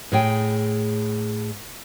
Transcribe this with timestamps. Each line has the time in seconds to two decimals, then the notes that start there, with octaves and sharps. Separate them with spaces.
0.12 A2 G#4 G5